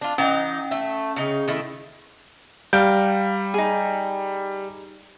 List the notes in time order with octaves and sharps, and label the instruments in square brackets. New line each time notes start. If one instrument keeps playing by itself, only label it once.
[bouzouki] D4 F4
[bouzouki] E3 D#4 [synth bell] C#4 G5
[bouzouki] A3 E5
C#3 D#4
D#3 A3 E4
[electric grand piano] G3 G6 D7 [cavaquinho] F5 A#5
[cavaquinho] D#4 G#4